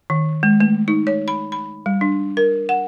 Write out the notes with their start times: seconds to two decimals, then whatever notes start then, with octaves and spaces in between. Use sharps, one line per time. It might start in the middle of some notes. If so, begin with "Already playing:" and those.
0.10 D#3
0.43 G#3
0.60 A3
0.88 D#4
1.07 C#5
1.28 B5
1.52 B5
1.86 G3
2.01 D4
2.37 A#4
2.69 F#5